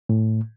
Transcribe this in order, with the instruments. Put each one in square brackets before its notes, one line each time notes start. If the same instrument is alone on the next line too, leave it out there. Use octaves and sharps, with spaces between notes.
[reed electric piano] A2